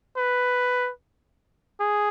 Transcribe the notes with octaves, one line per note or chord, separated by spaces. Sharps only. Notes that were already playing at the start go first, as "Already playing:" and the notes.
B4
G#4